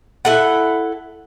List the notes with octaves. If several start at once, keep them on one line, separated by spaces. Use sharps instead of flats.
E4 A4 F#5